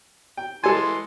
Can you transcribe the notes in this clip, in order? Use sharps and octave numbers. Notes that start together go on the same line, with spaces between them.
G5
E3 G#3 A4 G#5 C6